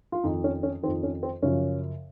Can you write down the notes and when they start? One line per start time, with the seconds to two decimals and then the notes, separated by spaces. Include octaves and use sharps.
0.12 F4
0.24 F2 D#3 D#4
0.44 C#4
0.63 C#4
0.83 D#3 C4
0.88 F2
1.03 C#4
1.23 C4
1.42 F#2 C#3 F3 C#4